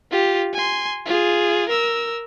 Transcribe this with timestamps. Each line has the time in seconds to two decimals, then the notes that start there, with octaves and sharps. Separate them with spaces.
0.11 F4 G4
0.54 G#5 C6
1.06 F4 G#4
1.69 A#4 E6